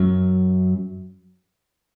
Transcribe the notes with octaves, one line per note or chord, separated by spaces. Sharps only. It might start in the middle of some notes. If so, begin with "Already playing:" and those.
Already playing: F#2 F#3